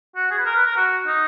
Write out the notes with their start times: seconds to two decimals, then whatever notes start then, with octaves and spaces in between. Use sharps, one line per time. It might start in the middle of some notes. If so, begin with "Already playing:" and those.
0.16 F#4
0.31 G#4
0.38 B4
0.46 A#4
0.56 B4
0.66 A#4
0.76 F#4
1.07 D#4